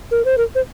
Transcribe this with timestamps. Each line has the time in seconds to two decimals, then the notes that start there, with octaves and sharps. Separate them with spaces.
0.11 A#4
0.25 C5
0.37 A#4
0.55 C5